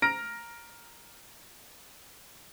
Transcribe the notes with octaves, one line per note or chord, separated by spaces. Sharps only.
A#5 F6 A#6 D7